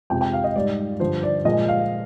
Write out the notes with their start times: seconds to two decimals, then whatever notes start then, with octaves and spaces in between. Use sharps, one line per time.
0.10 F2 C3 F3 G#3 G5
0.21 G5
0.33 F5
0.44 D#5
0.55 G#2 G3 D5
1.00 G2 D3 F3 C5
1.23 D5
1.45 A#2 F3 G#3 D#5
1.68 F5